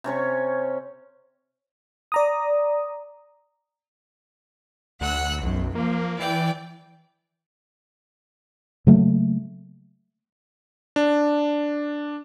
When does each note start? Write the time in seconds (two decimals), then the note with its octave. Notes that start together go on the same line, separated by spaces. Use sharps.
0.04 C3 C#4 C#5 C#6
2.12 D5 A#5 D#6
5.01 D2 F#5 E6 F#6
5.42 B1 F#2
5.75 F3 A#3
6.19 E3 D5 G5
8.87 C#3 F#3 A3 A#3
10.96 D4